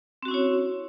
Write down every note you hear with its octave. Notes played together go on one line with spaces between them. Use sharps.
C4 C#4 E4 F#4 C#5